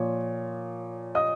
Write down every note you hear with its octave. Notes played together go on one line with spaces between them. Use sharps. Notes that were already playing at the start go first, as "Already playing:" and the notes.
Already playing: A#2 F3 C#5
D#5 D#6